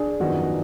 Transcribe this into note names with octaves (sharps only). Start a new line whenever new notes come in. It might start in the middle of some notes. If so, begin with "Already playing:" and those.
Already playing: D4 G#4
G#1 F#2 F3 B3 D#4 F#4